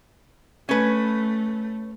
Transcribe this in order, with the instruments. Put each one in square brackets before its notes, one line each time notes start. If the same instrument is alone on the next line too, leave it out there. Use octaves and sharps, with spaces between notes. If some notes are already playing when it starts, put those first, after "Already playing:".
[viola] A3 [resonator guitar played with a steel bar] C#4 B4